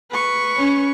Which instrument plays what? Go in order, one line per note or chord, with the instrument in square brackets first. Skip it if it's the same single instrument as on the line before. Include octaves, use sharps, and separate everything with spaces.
[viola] B4 C#6
[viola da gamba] C#4